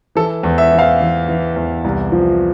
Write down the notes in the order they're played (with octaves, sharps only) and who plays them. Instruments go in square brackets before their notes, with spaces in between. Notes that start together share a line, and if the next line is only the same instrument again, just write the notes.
[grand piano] E3 A4
E2
E5
E3
F5
E3
E3
E2
C2
F3